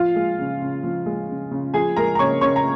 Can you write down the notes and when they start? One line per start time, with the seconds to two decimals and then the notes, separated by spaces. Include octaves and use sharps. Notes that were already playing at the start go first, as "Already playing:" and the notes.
Already playing: F3 F4 F5
0.16 G#3
0.39 C#3
0.62 C#3
0.83 F3
1.06 G#3
1.29 C#3
1.51 C#3
1.74 F3 G#4 G#5
1.97 G#3 A#4 A#5
2.15 A#5
2.19 C#3 C#5 C#6
2.41 C#3 C#5 C#6
2.56 A#5